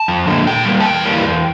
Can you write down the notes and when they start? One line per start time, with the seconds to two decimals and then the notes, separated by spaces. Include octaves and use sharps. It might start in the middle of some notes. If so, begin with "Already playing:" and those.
Already playing: A5
0.08 F2
0.27 D3 F3 A#3
0.47 A#2 G5
0.65 G3 A#3
0.80 A5
0.85 E2 G5
1.04 E3 G3 A#3
1.24 E2